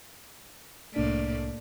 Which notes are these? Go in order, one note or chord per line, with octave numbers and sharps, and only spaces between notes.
C2 A2 A#3 D4 D5 B6